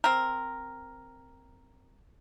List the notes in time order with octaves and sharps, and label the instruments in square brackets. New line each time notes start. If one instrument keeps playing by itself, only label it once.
[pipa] C4 A#4